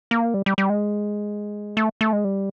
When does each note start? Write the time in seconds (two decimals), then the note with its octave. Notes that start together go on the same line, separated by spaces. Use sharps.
0.11 A#3
0.34 G3
0.46 G3
0.58 G3
0.70 G#3
1.77 A3
2.01 A3
2.13 G#3
2.24 G3